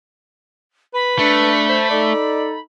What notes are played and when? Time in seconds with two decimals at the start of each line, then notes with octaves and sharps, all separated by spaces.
0.94 B4 B5
1.19 A3 D4
1.69 C5
1.91 D#4 A4 D5